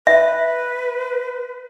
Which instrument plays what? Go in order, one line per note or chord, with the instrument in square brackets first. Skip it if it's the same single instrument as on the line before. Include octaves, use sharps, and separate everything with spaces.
[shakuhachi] B4 [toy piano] E5